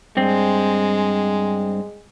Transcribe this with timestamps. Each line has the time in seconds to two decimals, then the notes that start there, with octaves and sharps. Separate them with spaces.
0.17 G2 G#3 C4